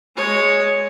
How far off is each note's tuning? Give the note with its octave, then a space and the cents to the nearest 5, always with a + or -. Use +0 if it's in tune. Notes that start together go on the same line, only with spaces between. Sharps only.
G#3 +0 C#5 +0